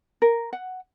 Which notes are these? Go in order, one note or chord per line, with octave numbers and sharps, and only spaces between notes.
A#4
F#5